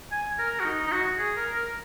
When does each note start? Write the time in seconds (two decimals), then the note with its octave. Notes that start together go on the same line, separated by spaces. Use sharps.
0.12 G#5
0.38 A#4
0.60 F#4
0.65 D#4
0.87 D#4
0.92 F#4
1.18 G#4
1.36 A#4
1.54 A#4